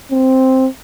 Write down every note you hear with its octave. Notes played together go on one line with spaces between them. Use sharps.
C4